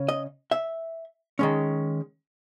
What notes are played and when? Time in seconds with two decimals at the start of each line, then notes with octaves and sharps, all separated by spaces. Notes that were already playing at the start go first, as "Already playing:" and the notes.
Already playing: C#3 C#4
0.09 D#5
0.51 E5
1.39 D#3 G#3 C#4